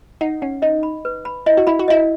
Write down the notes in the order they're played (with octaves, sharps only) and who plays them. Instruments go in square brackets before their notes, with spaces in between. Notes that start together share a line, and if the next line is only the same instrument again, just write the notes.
[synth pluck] D#4 [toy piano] F#5
[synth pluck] C#4 [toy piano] F#5
[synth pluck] D#4 [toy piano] D#5
[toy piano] B5
B4
B5
[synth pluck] E4 [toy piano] D#5
[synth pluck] F#4
[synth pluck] E4 [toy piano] B5
[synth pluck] F#4
[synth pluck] E4 [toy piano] D#5